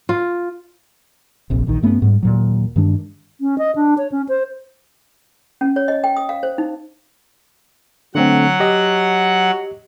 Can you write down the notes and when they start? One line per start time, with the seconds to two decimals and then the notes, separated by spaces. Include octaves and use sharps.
0.09 F4
1.50 F1 A#1 F2
1.67 A#1 D#2 D#3
1.82 G2 A3 B3 C#4
2.02 G#2 G3
2.23 D#2 A#2 F#3
2.76 G2 D#3 G#3 D4
3.41 C#4
3.58 D#5
3.76 D4
3.98 C#5
4.12 C#4
4.29 C5
5.61 C#4
5.76 C#5
5.88 D#5
6.04 G5
6.17 D#6
6.29 F5
6.43 C5
6.58 D#4
8.15 D3 F#3 A3 C4 F#5
8.60 G4 D#5